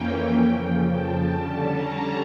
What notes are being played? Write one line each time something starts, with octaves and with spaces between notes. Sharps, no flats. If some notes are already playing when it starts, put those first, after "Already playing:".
Already playing: F2 E3 A#3 C#4 G5
F2 C#3 F3 G5
A5
D3 G3 C#4
A#5